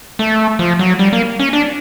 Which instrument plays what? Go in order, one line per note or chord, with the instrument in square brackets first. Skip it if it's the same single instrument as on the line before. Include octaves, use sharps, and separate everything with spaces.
[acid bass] A3
F3
F#3
G3
A#3
C#4
D4